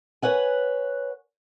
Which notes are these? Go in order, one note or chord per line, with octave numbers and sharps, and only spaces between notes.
B4 C#5 F#5 G#5